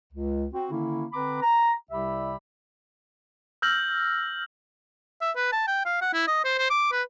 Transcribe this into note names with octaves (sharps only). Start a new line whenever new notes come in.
C#2
C4 F#4
D3 D#3 A#3 C#4 E4
D3 C4 B4 A#5 B5 D6
A#5
C2 C3 G3 G4 E5 B5
E6 F6 G6 A#6 F#7
E5
B4
A5
G5
F5
F#5
E4
D#5
C5
C5
D6
B4